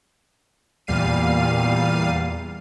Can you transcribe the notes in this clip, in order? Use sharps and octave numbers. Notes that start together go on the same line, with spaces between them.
E2 A#2 G3 F5 C7 D#7